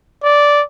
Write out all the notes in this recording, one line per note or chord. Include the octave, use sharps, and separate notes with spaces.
D5